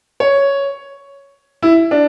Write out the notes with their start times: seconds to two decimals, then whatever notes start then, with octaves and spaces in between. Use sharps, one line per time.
0.20 C#5
1.62 E4
1.91 D4